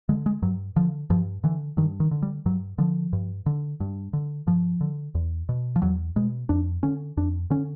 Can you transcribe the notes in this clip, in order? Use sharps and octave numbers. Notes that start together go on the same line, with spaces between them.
D3 G#3
G#3
G2 F#3
D3 F3
G2 F3
D3 E3
G2 D#3
D#3
D3
G3
G2 F#3
D3 F3
G2
D3
G2
D3
G2 F3
D3
E2
B2
F3
E2 F#3
B2 G#3
F2 D4
D3 C#4
F2 D4
D3 C#4